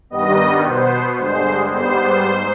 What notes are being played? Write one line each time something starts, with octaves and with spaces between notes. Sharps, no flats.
G2 D#3 G3 B3 D#5
B2 B3 C5
G2 D3 G#3 C5
G#2 G3 B3 C5
G#2